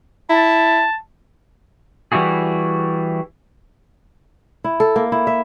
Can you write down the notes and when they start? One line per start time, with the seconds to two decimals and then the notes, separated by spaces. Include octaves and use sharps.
0.30 E4 A5
2.12 E3 G3 E4 F#4 G#4
4.64 E4
4.80 A4
4.96 A#3
5.12 E4
5.27 E5